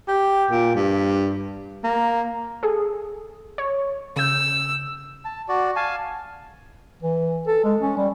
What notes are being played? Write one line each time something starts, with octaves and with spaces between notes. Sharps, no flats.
G4
A#2
G2
A#3
G#4 A4
C#5
C#3 E6 G6
A5
F#4 D5
F5 G#5 A5
E3
A4
G#3
C#4
G3